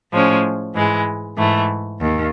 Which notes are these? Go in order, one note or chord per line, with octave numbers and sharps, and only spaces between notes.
A2 F3 G#3 C#4
G#2 E3 G#3
G#2 E3 A3
D#2